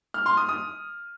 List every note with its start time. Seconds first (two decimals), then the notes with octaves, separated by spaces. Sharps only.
0.14 F6
0.26 C6
0.37 D#6
0.49 D#6